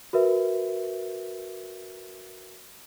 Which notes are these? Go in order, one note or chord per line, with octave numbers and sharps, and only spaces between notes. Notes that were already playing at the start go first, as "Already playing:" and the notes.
F#4 A#4 B4 E5